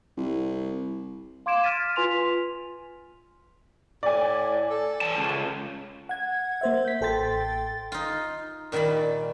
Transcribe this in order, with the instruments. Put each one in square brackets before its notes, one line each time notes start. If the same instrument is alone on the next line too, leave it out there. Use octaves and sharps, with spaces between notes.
[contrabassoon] C2
[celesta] F5 C6 D6 G#6 D7 E7
F6 G#6 A6 B6 D#7 E7
F6
F4 B4 G#5 C6 B6 F7
[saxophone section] A2 [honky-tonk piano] D5 G#5
[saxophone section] A4
[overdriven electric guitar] E3 A5
C#2
[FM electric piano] F#5 G#6
A#3 C5 E5
G6 B6
A1 A4 G5 C6 A6
[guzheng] D#4 F4
A#2 D#3 G3 A5 B5